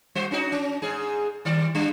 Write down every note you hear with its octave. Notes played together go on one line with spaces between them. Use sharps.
G3 F#4 C5
C#4 D#4 F#4
C#4
G#2 G#4
D#3 G3 D5
G3 D4